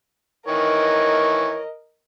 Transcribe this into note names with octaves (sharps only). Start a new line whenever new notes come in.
D#3 E3 A#4 C#5 D#5